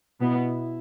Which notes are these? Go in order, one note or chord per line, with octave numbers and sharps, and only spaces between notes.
B2 B3 E4